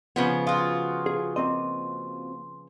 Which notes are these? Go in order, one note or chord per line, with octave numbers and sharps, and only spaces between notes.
C#3 F3 B3
F4 F#4 F5 D#6
G#4
A#3 C4 D#5 C6